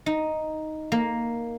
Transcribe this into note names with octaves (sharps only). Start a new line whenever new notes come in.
D#4
A#3